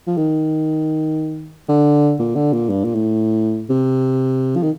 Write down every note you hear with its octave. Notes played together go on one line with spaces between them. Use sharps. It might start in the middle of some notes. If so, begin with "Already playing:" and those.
F3
D#3
D3
A#2
D3
A#2
G2
A#2
A2
C3
F3
D#3